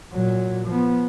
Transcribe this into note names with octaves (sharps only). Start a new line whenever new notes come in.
A#2 F#3
F3 B3